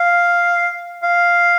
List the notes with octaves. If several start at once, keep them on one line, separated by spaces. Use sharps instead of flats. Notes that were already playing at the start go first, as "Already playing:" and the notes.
Already playing: F5
F5